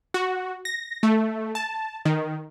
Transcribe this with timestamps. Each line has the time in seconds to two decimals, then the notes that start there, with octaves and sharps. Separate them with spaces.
0.14 F#4
0.65 A#6
1.03 A3
1.55 A5
2.05 D#3